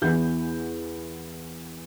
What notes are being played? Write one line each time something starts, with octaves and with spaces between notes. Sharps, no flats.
E2 E3 B3 G6